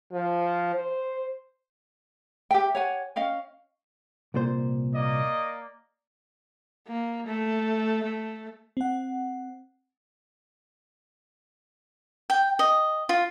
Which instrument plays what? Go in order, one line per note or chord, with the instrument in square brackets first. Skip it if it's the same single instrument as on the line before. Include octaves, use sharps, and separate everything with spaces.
[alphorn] F3
C5
[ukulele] G4 E5 G5
C#5 F#5 G#5
C#4 D#5 F5 G5
[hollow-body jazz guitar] C2 A#2 C5
[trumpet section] A#3 D5 D#5
[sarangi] A#3
A3
A3
[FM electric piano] C4 F#5
[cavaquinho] G5
D#5
F4